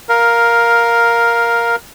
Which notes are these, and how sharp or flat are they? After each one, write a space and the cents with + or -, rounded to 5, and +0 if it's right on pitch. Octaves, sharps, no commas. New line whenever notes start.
A#4 +5 F5 +0